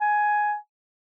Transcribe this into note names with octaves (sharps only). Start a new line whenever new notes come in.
G#5